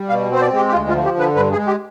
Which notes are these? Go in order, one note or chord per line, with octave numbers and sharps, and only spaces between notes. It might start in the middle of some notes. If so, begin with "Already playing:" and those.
Already playing: G3
B2 F5
C4 C5
D5
G#3 G4
G4
D2 F4
F4
F3
G4
D3 B4
G2 B4
G#4
G#3
G4